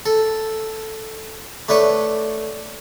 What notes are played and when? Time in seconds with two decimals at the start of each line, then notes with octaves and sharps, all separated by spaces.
0.06 A4
1.69 A3 D4 B4 C#5